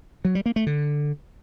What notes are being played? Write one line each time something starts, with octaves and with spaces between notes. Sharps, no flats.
F#3
G3
A#3
A3
D3